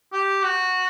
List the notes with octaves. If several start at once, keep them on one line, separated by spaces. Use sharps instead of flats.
G4
F#4